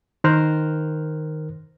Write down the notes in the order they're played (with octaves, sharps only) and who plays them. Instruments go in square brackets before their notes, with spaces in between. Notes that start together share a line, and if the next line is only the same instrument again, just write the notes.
[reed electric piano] D#3 A#4 C5 F6 F#6